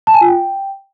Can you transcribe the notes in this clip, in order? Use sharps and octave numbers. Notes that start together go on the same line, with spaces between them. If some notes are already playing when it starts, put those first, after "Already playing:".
A5
G#5
F4
G5